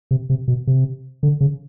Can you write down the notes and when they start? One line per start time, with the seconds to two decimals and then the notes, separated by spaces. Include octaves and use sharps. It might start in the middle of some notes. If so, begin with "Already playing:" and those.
0.11 C3
0.30 C3
0.48 B2
0.67 C3
1.23 D3
1.41 C#3